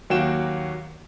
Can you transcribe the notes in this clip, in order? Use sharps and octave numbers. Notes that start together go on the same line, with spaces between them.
D#2 F#3 A#3 F#4 G5 E7